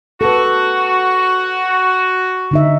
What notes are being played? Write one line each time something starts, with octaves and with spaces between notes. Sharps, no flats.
F#4 A4 B4
D3 D#4 E5